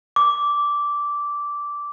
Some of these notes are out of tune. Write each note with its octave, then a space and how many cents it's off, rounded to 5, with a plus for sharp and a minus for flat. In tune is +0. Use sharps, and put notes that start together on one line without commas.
D6 -10